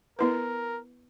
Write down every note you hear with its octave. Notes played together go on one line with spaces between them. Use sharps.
B3 E4 A#4 B4